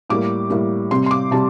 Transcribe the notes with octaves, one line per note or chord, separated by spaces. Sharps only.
A2 G3 A#3 D6
A2 G3 A#3
C3 G3 C4 C6
C6
D6
C3 G3 A5